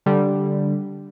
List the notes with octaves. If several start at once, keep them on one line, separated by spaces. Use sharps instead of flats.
D3 G3